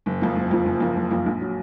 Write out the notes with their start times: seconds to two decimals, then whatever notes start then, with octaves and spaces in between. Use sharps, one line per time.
0.06 F#1
0.21 F2 F3 A#3
0.36 F#1
0.51 F2 F3 A#3
0.66 F#1
0.80 F2 F3 A#3
0.96 F#1
1.11 F2 F3 A#3
1.26 A#1
1.41 F#3